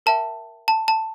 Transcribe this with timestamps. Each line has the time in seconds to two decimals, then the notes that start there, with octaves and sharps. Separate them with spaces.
0.06 A#4 E5 G5 A5
0.68 A5
0.88 A5